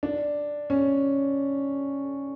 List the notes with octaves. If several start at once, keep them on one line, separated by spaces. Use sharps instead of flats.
D4
C#4